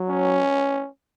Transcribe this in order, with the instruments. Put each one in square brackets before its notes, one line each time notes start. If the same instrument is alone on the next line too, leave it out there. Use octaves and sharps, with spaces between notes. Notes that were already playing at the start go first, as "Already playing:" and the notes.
Already playing: [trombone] F#3
[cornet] C#4